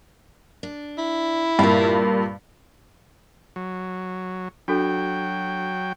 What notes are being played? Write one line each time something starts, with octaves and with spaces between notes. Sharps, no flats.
D4
E4
G2 A#2 A#4 F5
F#3
F#3 D4 F#4 A4 G5